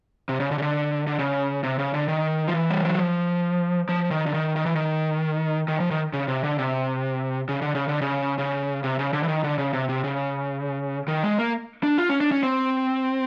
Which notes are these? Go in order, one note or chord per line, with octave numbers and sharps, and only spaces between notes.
C3
C#3
D3
C#3
D3
D3
C#3
C3
C#3
D3
D#3
F3
E3
G3
F#3
F3
F3
D#3
D3
D#3
D#3
E3
D#3
D#3
F3
D#3
C#3
C3
D3
C3
C#3
D3
C#3
D3
C#3
C#3
C3
C#3
D3
E3
D#3
D3
C#3
C3
C3
C#3
D#3
G#3
A#3
D4
F4
C#4
D4
C#4
C4